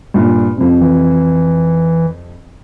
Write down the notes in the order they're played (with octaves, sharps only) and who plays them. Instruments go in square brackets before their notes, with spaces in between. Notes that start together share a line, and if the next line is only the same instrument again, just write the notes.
[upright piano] G2 A#2
F2 C3
[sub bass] E3